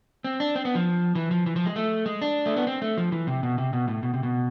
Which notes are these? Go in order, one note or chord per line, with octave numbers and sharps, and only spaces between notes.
C4
D4
C4
B3
F3
E3
F3
E3
F3
G#3
A3
G#3
D4
A3
B3
C4
A3
F3
E3
C3
B2
C3
B2
A2
B2
C3
B2